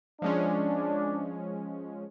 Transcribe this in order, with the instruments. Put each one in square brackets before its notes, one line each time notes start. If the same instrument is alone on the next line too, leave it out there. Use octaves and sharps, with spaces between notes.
[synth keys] F3 G#3 C#4 [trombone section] D4